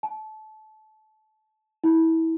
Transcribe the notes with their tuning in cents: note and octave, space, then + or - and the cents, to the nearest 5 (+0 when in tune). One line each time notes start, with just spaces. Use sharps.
A5 -25
E4 -25